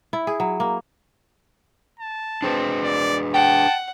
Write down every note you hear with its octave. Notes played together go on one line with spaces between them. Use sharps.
E4
G#4
F#3
A#3
A5
C4 D4 G#4 B4
D5
F#5 G5 A5